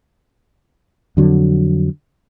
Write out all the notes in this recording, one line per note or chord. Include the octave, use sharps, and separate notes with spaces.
F2 D3 F#3